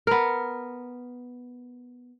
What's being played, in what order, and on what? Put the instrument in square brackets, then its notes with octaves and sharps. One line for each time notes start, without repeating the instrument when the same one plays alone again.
[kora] B3 A#4